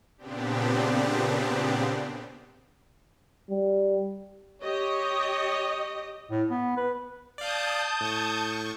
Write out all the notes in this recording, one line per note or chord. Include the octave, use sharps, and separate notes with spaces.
A#2 C#3 B3 C4 D4 G4
G3
G4 C#5 D#5
A2
B3
B4
D5 F5 A5 D#6 G6
A2 C#6